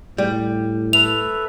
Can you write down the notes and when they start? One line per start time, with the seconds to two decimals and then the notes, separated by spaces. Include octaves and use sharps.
0.18 A2 G3
0.93 A4 B4 E5 F7